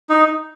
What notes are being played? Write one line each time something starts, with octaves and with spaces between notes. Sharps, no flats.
D#4